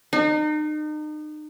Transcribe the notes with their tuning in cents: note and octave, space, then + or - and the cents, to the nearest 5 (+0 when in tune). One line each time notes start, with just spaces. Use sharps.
D#4 -35